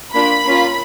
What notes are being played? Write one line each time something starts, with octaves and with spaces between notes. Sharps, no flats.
A#3 D4 F4 B5
A#3 C#4 F4